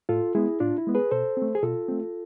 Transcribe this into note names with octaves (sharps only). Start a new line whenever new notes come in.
A2 F4 A4
G#3 B3 E4 G#4
A2 D4 F4
E4
G#3 B3
G#4 B4
B2 A4 C5
A3 C4
G#4
B2 F4 A4
A3 C4